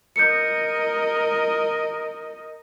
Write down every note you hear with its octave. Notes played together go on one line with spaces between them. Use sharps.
A#4 D#5 G6 C#7